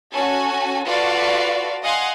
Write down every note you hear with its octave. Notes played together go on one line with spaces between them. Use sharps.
C#4 F#4 A4 G#5
F4 F#4 A4 B4 D5 F5
D#5 F5 F#5 G#5 C6